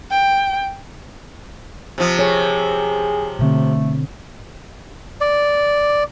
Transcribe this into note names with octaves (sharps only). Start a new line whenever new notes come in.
G5
C3 F3
G#4 C#5
B2 D3 A3 C4
D5